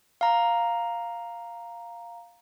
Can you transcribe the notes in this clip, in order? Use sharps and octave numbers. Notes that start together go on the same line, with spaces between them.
F5 A#5